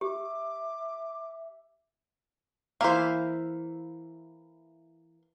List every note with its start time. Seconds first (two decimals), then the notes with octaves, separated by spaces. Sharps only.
0.01 G4 E5 D6
2.81 E3 A#3 C5 E5 F5